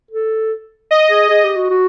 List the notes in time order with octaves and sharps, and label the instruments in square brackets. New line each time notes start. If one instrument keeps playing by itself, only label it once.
[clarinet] A4
[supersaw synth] D#5
[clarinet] G#4
G#4
G4
F#4
F#4